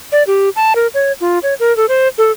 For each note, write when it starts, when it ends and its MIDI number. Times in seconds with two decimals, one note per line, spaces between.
0.12 0.23 74
0.27 0.49 67
0.56 0.73 81
0.76 0.87 70
0.94 1.12 73
1.21 1.39 65
1.43 1.54 73
1.60 1.75 70
1.77 1.86 69
1.89 2.08 72
2.18 2.32 69